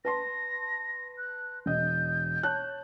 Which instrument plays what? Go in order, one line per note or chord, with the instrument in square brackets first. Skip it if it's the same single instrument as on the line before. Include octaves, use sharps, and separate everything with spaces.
[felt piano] B4 A5 C6 [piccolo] A#6
[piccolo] F#6
[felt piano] E1 D#5 [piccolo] G6
[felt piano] C#5 A5 F#6